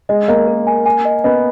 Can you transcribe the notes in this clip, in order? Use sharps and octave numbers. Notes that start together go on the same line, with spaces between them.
G#3 D#5
A#3 D#5
A#4
G#5
G#5
D#5
B3 D#5